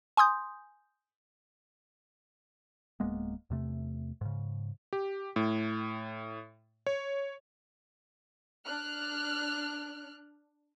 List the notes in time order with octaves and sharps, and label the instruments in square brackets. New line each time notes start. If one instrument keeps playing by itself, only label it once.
[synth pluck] G#5 C6 D#6 G6
[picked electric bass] D1 G#3 A#3 B3
E2 C3 A3
G#2 C#3
[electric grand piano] G4
A2
C#5
[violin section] D4 F6 F#6